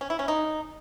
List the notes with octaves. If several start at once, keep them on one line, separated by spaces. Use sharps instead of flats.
C#4
E4
C#4
D#4